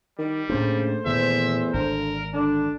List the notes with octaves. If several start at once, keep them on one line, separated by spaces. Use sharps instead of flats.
D#3 G3
A2 C#3 A3 A#3 D4 C5
E2 A#2 D#3 E3 E5
G#1 D3 A#4
D3 D4